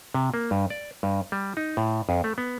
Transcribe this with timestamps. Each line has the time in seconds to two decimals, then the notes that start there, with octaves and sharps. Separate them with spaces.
0.14 C3
0.34 A#3
0.51 G2
0.70 D5
1.03 G2
1.32 G3
1.57 D#4
1.77 A2
2.09 F2
2.24 A3
2.38 B3